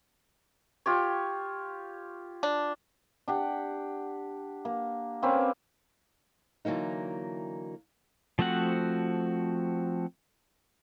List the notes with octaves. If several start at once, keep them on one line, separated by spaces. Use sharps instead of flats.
F4 G4 C#5
D4
D4 G4 F#5
A#3
A#3 C4 C#4 B4
D3 E3 F#3 A#3 D#4
F3 A3 C4 F#4 F#5